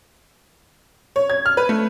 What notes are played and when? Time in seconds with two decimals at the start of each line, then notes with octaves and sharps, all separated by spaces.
1.16 C#5
1.30 G#6
1.46 F6
1.57 B4
1.69 A3